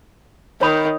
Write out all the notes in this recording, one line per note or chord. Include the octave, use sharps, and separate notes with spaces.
D#3 C#5 B5 D#6